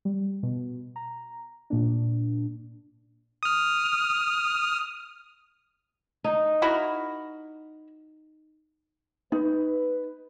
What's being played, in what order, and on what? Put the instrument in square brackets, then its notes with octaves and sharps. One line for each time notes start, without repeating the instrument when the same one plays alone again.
[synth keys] G3
B2
A#5
A#2 A#3 D4
[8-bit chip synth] D#6 F6
[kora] D#4
[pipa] E4 F#4 A#4
[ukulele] D#4 [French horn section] B4